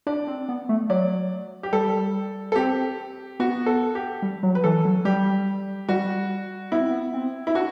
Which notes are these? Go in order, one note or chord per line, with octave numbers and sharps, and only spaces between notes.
D4 D5
C4
B3
A3
F#3 D5
G4
G3 A4
A4
C4 G4
B3 F#4
A4
G4
G3
F#3
B4
E3 A4
F#3
G3 G4
G3 F#4
B3 E4
C4
B3
C4
E4
D4 F#4